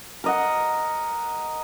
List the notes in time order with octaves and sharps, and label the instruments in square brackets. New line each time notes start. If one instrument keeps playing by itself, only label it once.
[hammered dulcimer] A#4 D#5 F#5